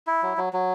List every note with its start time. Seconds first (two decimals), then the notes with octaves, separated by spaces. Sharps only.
0.07 E4
0.23 F#3
0.37 F#3
0.53 F#3